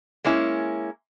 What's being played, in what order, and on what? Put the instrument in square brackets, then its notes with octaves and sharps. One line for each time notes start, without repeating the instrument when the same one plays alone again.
[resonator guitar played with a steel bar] G#3 A#3 C#4 E4